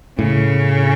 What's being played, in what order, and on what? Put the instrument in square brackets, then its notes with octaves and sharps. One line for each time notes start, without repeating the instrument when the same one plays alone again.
[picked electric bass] A2 [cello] C#3